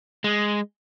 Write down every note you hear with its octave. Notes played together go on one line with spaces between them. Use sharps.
G#3